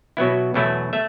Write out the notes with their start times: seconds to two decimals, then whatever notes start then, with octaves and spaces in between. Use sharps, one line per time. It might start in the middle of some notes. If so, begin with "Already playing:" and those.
0.17 B2 F#3 B3 E4
0.54 E2 B2 F#3 A3 E4
0.93 A3 E5